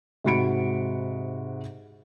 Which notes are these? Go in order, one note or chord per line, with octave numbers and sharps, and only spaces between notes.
G#2 C3 F#4 B5 C#7 D7